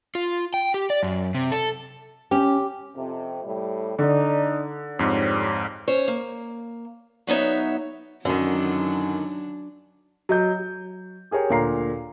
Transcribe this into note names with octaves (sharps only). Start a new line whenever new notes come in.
F4
G5
G4
D5
F#2
C3
A4
C#4 G4
F2 C3
A2 G3
D3 D4 D#4 D5
F2 G#2 G3 C4 C#5
C#4 C5 C#5
A#3
F#3 B3 D#4 C#5 E5
F#2 D3 D#3 F#3 D4
F#3 D#5 G6
F#3
G4 G#4 A#4 C#5 G5
D2 A#2 F5 A#5 C7